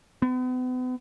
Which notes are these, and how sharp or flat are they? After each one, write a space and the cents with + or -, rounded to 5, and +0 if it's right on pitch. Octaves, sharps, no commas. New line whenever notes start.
B3 +40